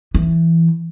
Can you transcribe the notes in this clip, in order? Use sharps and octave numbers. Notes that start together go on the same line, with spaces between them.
E3